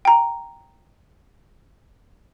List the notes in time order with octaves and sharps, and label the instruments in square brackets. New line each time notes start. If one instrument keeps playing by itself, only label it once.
[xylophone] G5 A#5